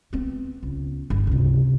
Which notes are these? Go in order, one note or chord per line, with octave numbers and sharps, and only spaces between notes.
B3 C4
C#2
G1
C#2 C3